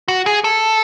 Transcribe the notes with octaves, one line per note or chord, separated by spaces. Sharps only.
F#4
G#4
A4